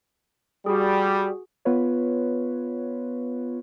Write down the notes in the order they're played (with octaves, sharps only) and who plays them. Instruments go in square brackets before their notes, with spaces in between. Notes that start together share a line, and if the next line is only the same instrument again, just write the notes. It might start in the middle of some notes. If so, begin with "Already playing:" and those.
[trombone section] G3 [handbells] F#4 G#4
[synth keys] B3 F4 B4 C#5